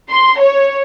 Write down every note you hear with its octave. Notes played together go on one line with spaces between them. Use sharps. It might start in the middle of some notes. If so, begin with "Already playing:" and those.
C6
C#5